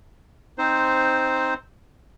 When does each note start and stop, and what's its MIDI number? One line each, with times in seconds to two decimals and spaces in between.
0.58 1.54 60
0.58 1.54 63
0.58 1.54 72